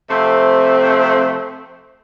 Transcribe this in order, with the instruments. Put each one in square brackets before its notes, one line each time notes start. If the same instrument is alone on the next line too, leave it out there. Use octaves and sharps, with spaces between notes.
[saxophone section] C3 F3 A3 C4